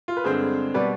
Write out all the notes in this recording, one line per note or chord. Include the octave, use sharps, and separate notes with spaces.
F4
B4
G2 D3 G#3 C4 G#4 C5
B2 G3 B4 D5